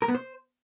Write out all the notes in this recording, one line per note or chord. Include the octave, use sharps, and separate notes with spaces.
A#4
B3
C5